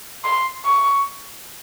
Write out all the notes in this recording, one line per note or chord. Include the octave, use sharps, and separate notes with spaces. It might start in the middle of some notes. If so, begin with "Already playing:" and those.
C6
C#6